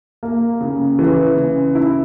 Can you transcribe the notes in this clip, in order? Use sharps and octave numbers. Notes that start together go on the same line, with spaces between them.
A#3
C#3
E3
C#3
E4